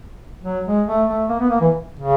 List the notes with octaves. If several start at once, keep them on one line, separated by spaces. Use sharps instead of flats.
F#3
G#3
A3
A3
A#3
B3
A#3
E3
C#3